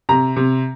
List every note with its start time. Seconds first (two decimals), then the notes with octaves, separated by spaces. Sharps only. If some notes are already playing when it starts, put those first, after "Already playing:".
0.09 C3 A#5
0.36 C3